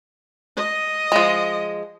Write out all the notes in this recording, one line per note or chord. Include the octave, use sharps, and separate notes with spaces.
D#5
F3 G#3